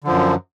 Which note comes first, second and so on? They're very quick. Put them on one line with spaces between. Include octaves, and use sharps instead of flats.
D3 F3 F#2